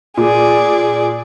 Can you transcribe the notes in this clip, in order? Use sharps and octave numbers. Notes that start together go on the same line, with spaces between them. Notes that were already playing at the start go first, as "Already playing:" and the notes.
A#2 G#4 D5